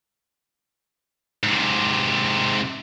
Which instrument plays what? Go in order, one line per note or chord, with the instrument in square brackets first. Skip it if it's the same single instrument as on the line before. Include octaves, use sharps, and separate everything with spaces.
[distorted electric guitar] G#2 C3